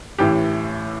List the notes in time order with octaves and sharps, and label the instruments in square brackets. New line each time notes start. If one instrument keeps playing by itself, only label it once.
[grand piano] A1 A2 E3 G4